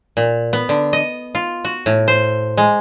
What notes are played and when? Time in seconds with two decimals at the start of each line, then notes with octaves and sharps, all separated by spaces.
0.17 A#2
0.53 B3
0.69 D3
0.93 D#5
1.35 F4
1.65 F#4
1.86 A2
2.08 C5
2.57 G#3